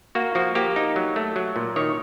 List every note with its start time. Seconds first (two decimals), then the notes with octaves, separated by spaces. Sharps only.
0.15 A#3 F#4
0.35 F3 F#4
0.55 A#3 G4
0.76 D#4
0.96 F#3
1.16 A3
1.36 F#3
1.56 A#2
1.76 D#3 C#5